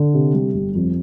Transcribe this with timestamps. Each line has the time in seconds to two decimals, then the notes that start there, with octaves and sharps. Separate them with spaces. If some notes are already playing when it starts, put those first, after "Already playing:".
Already playing: D3
0.14 C3
0.34 G3
0.54 G1
0.75 F2